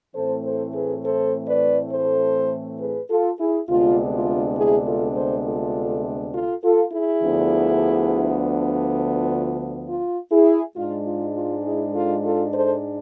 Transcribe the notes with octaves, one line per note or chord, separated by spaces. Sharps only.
A2 E3 A3 C4 A4 C5
A4 C5
G#4 B4
A4 C5
B4 D5
A4 C5
G#4 B4
F4 A4
E4 G#4
D2 C3 G#3 B3 D4 F4
F4
E4 G#4
F4 A4
A4 C5
F4 A4
F4 A4
F4 A4
E4 G#4
D2 D3 F3 B3 D4
F4
F4
E4 G#4
G#2 G#3 D4 F4
F4
F4
E4 G#4
F4 A4
F4 A4
A4 C5